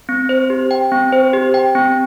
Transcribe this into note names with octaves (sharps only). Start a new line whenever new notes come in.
C4
C5
G4
G5
C4
C5
G4
G5
C4